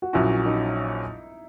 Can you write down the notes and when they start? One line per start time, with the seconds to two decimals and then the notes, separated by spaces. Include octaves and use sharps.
0.02 F#4
0.13 A#1 A#2 F#3 C#4 E4 F#4
0.46 D#4